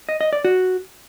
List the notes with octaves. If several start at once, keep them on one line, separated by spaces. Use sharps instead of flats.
D#5
D#5
D5
F#4